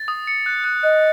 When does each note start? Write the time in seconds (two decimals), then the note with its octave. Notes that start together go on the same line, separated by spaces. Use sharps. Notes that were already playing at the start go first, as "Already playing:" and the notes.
Already playing: A6
0.08 D#6
0.27 C#7
0.46 F#6
0.64 F#6
0.83 D#5 F#6